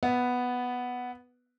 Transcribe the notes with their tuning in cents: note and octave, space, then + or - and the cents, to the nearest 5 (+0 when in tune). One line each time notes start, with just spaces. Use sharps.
B3 +0 B4 +0 E5 +0